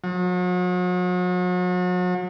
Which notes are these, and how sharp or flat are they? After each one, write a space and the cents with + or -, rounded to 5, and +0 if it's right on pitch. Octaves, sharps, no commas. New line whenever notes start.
F#3 -40